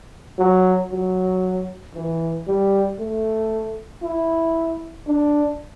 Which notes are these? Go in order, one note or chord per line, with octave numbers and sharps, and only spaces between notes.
F#3
F#3
E3
G3
A3
E4
D4